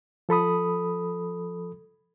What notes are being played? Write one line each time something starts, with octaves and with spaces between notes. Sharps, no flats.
F3 A4 B5 D#6